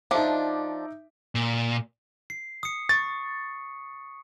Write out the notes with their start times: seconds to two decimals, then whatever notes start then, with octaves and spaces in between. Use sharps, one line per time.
0.11 F3 D4 D#4 E5 D6
1.35 A#2
2.30 C7
2.63 D#6 C#7
2.89 C#6 A6